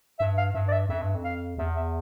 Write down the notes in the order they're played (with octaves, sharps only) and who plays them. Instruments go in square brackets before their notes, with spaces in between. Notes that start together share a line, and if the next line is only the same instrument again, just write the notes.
[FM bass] G2 [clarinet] E5
[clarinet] F5
[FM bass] G2 [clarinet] E5
[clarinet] D5
E5
[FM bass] F2 [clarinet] E5
[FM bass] G2
F2
[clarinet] F5
[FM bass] E2 [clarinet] E5
[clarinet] E5